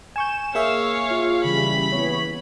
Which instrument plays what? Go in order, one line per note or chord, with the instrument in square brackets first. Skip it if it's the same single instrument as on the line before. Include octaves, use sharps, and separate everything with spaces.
[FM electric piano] G#5 C#6 G6 [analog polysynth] E7
[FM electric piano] A#3 G#4 E5 [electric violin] C#5 F5
[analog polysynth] F4
[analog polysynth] C#3 E3 G3 [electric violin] B5
[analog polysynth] E3 B3 C#5